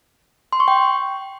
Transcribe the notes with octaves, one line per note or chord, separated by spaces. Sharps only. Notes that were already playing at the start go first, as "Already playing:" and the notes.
C6
C#6
G5